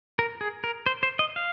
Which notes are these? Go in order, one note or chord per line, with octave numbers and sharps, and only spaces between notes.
A#4
G#4
A#4
C5
C5
D#5
F5